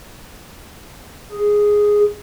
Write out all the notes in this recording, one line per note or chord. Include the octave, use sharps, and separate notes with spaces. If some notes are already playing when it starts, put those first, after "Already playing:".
G#4